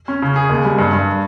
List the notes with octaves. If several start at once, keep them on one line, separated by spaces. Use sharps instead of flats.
C#4
C#3
G#4
D#2
G3
G2
G2